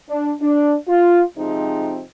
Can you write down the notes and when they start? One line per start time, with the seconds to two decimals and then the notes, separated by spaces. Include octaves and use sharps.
0.10 D4
0.42 D4
0.89 F4
1.36 C3 F3 G#3 C4 D#4